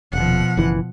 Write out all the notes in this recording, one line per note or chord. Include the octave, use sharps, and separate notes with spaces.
D#1 B2 F3 F#5
F#1 E3